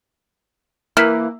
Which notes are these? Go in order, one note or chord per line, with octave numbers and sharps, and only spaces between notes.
E3 A#3 F6 B6